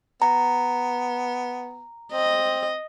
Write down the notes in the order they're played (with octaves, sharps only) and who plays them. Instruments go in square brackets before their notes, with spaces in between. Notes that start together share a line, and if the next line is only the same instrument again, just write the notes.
[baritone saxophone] B3 [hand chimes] A#5
[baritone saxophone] C4 [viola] D#5